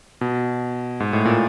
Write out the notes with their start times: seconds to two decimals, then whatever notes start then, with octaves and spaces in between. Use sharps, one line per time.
0.21 B2
1.00 G#2
1.13 A2
1.25 A#2